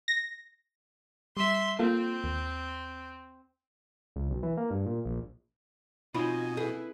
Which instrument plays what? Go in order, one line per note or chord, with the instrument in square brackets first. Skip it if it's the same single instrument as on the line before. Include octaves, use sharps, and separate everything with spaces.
[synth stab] A#6
[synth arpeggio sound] G3 [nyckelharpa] E5 C6
[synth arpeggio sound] A#3 F4 A4 [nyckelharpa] C4
[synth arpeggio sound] D#2
[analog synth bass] C#2
B1
E3
A#3
G2
A#2
A#1
[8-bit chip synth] B2 [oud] C4 F4 [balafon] D#4 B5 [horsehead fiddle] D#5 G#5
[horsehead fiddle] E4 B4 [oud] G#4 [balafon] A4